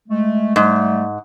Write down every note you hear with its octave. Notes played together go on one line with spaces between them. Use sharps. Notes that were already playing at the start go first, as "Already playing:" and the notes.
G#3 A3
G#2 G3 A3